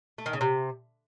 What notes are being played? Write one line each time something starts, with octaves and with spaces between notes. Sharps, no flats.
A3
D#3
C#3
C3